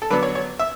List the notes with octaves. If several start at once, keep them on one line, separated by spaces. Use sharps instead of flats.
A4
D3 F#3 B3 D4 B4
C#5
C#5
E5